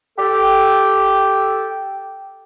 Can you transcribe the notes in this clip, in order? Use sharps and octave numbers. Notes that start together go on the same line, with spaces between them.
G4 A4 G5